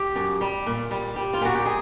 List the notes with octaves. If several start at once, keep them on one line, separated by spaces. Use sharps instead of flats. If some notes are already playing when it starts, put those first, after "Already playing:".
Already playing: G4
F#2
G3
A#2
G3
G3
F4
A#2 F#4
G4
G#4